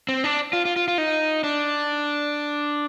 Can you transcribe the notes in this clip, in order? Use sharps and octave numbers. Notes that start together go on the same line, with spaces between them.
C4
D4
F4
F4
F4
F4
D#4
D4